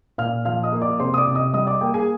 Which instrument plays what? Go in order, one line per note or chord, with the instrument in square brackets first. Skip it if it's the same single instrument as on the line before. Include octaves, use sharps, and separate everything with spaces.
[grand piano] A#2 F5 F6
F3 F5 F6
D#5 D#6
A#3
D5 D6
C3 C5 C6
D#6
D5 D6
C3
D#5 D#6
G3 D#5 D#6
D5 D6
A#3 G5
G#4 G#5